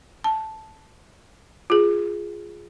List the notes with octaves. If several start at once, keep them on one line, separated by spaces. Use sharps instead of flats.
A5
F4 G#4